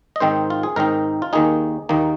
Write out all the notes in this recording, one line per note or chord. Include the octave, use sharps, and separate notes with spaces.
D#5
G#2 D#3 C4 D#4 C5
F4
G#4
G#2 D#3 C4 D#4 A#4
F4
D#2 D#3 A#3 D#4 G#4
D#2 D#3 A#3 D#4